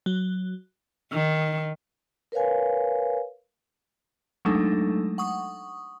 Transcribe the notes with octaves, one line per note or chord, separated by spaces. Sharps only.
F#3
D#3
A#4 B4 C#5 F5 G#5
F#3 G#3 A3 D4 D#4 A4
F#5 C#6 D#6